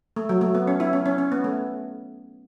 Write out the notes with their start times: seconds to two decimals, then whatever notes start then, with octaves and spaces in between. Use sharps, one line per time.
0.16 A3
0.29 F#3
0.41 A3
0.55 B3
0.67 C#4
0.80 E4
0.93 C#4
1.06 C#4
1.18 C#4
1.32 B3
1.44 A3